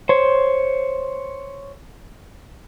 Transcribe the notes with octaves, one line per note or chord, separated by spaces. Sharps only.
C5 C#5